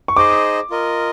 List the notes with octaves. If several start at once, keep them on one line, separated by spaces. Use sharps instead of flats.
C#6
D#4 G#4 C5 D#5 D6
F4 A#4 D#5